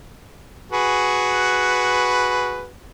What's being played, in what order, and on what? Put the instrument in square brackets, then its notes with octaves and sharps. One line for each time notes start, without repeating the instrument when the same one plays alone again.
[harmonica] F#4 G#4 B4